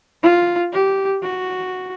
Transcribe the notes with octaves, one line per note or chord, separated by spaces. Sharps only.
F4
G4
F#4